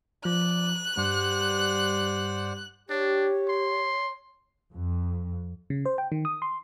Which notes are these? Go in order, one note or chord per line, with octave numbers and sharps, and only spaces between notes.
F3 D5 F#6
G2 G3 C5 D5 F#5
D4 G4 C#5
C6
F2
C#3
C5
G5
D#3
D#6
C6